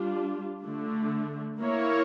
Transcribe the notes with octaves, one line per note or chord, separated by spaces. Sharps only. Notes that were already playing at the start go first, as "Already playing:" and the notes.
Already playing: G3 D4 F4
D3 A3 D4
A#3 E4 A#4 C#5